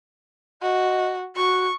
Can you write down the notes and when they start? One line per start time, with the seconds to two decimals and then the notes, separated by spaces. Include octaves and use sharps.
0.62 F#4 D#5
1.36 F#4 C#6